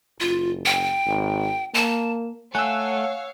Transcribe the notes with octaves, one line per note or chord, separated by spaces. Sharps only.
F#1 F4
G5
G#1
A#3 A5
A3 C#5 F5 F#5 G#5 E6 F#6